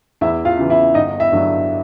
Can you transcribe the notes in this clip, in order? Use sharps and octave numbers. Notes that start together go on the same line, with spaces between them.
E2 E4 E5
F4 F5
C#3 E3
E4 E5
G1 D#4 D#5
E4 E5
G2 D3 F#3